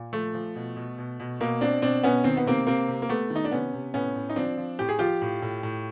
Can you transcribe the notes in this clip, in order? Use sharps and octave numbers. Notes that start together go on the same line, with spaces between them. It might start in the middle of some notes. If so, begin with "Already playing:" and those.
Already playing: A#2
F3 A3
F3
B2
B2
B2
B2
B2 A#3
B2 C4 D4
B2 C4 D4
B2 B3 C#4
D#3 C4
B3
C3 A#3 C4
C3 A#3 C4
C3
A#3
C3 A3 B3
D#3
D#4
D4
C3 B3 C#4
C3
A2 B3 C#4
A2
D#4
F3 C4 D4
F3
A2 G4
G#4
F3 F4 G4
A2
A2
A2